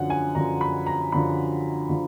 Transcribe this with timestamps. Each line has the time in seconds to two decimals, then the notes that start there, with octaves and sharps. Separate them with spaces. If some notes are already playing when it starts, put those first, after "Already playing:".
Already playing: F#2 D3 F3 F#5
0.10 G#5
0.35 F#2 D3 F3 A#5
0.61 B5
0.87 A#5
1.12 F#2 D3 F3 B5
1.89 D3 F3